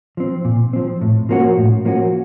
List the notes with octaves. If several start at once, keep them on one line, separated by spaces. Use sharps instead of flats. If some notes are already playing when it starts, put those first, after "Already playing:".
F3 C4
A#2
F3 C4
A2
F3 A#3 C#4 F#4
A2
F3 A#3 C#4 F#4